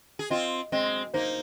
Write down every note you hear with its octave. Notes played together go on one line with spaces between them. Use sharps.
G#4
C4 F4 D#5
G#3 C4 D#5
A#3 D#4 C5